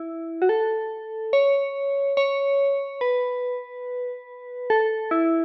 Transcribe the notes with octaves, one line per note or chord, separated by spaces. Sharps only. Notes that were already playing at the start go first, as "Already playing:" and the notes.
Already playing: E4
F#4
A4
C#5
C#5
B4
A4
E4